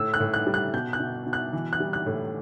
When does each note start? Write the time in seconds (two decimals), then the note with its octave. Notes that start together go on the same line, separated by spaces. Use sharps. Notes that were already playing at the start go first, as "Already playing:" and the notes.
Already playing: A2 E6
0.14 F#6
0.20 A2
0.34 F#6
0.47 G3
0.54 F#6
0.73 B2 G6
0.93 F#6
1.00 B2
1.26 B2
1.33 F#6
1.53 E3
1.73 F#6
1.80 G3
1.93 F#6
2.06 A2